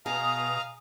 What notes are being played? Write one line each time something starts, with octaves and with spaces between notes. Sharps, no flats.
B2 G#4 F5 A#5 D#6